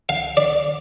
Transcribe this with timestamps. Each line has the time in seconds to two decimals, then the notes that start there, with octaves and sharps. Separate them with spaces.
0.09 F5
0.37 D5